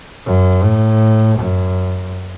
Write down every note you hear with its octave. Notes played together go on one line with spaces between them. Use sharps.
F#2
A2
F#2